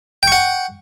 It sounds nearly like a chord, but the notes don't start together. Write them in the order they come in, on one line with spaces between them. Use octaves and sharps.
G5 C#6 F#5